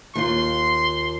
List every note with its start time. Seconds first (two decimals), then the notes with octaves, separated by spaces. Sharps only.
0.15 D#2 F4 C6